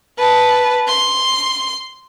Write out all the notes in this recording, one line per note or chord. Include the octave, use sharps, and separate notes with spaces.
B4 A5
C6